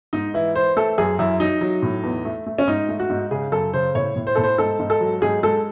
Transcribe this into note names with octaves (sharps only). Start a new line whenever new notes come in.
G#2 D#4
E3 E4
E3 C5
A3 A4
F#2 G#4
F#2 E4
F#3 D#4
F#3
A2
E2
A3
A3
C#4
G#2 D#4
A3
F#4
G#2
C#3 G#4
F#2 A4
C#3 C5
A2 C#5
A2
C5
A2 A4
C5
G#2 A4
G#2
A4
F#3
G#2 G#4
G#3 A4